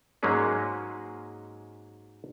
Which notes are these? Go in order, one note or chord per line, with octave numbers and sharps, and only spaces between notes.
G#2 F#3 G#3 A#3 C#4 G#4